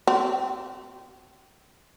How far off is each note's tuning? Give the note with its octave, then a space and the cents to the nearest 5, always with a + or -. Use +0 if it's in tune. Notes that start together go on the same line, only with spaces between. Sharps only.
C4 -20 G4 -40